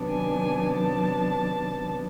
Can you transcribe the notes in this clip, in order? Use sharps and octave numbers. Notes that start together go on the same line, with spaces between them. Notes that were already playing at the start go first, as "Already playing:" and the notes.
Already playing: C3 D#3 F#3 B3 D4
G#5
A5